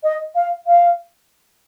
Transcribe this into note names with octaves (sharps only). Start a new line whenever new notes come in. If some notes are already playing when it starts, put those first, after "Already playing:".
D#5
F5
F5